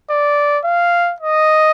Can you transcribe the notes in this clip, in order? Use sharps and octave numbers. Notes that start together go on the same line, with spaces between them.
D5
F5
D#5